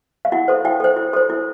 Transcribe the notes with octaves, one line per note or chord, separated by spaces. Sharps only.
F5
E4 F#5
A4 C5
E4 G5
A4 C5
E4
A4 C5
E4